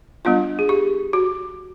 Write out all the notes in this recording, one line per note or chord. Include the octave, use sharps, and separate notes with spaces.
G3 B3 D4 F4
G#4
G4
F#4